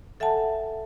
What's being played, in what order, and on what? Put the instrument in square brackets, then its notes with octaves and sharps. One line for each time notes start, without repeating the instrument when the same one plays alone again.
[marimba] A4 E5 F#5 G#5 A5